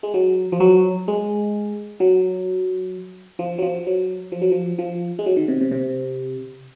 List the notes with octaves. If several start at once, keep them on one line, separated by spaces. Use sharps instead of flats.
G#3
F#3
F3
F#3
G#3
F#3
F3
F#3
F3
F#3
F3
F#3
F3
F3
G#3
F#3
D#3
C3
C3
C3